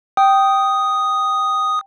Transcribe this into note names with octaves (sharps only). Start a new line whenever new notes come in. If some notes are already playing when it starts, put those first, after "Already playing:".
G5 D#6